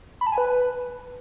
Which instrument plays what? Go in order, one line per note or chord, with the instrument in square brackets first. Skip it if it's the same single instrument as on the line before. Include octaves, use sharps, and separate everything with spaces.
[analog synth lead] B5
A5
G#5
B4